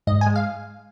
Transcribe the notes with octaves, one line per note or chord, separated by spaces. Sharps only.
G#2 D#5
G#5
G#3
F5